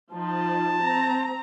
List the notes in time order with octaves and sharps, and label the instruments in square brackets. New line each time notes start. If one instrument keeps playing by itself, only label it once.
[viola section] F3 D#4 F4 [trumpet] A5
[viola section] C4 A#5